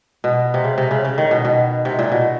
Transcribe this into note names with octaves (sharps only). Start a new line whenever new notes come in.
B2
C3
C#3
C3
C#3
C#3
D#3
B2
B2
C3
A#2
B2